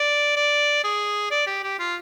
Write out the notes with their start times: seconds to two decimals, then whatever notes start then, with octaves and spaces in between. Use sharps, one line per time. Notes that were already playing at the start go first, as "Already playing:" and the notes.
Already playing: D5
0.36 D5
0.84 G#4
1.31 D5
1.47 G4
1.64 G4
1.79 F4